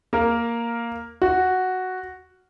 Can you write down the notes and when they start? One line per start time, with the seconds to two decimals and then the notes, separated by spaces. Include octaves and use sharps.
0.13 A#3 A#4
1.22 F#4